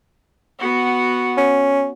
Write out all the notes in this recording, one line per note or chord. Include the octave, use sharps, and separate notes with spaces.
B3 F#4
C#4